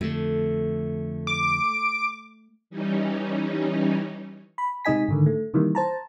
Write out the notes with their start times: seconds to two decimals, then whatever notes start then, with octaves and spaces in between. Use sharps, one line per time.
0.01 F2 D3 A3
1.27 D6
2.70 E3 G3 C#4 D#4
4.58 B5
4.85 C3 G#3 D#4 D#5 G#5 B6
5.08 G#2 D3 D#3
5.26 A3
5.54 C3 D#3 E3 G3 A#3
5.75 C5 A5 A#5